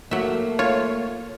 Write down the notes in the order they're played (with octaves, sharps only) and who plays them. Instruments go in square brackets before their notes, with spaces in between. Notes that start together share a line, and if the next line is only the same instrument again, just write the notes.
[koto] F#3 E5 [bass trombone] A3 [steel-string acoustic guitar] A#3
[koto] F4 [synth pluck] C#5